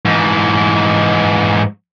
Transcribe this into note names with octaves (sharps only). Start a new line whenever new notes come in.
G#2 E3